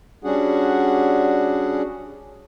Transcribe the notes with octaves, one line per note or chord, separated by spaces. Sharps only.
G3 C#4 D4 F#4 G#4 F#5